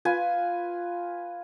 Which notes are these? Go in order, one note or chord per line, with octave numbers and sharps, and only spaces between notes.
F4 B4 G#5